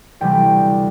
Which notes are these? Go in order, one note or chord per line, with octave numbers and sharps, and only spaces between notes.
D2 C3 E3 G3 G5